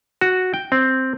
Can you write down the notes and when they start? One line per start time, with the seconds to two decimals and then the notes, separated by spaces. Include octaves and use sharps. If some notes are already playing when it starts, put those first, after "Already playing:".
0.21 F#4
0.54 G5
0.72 C4